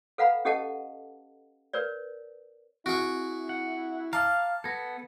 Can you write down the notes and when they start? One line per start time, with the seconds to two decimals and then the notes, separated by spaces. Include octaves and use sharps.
0.18 A4 B4 F5 F#5 A#5 B5
0.45 C#4 G4 A4 D#5 F#5 A5
1.73 A#4 B4 C#5 D5
2.86 C4 E4 F#4 G#4 F#6 D7
3.49 F#5
4.13 F5 A5 A#5 D6 E6
4.64 B3 A4 G#6 A#6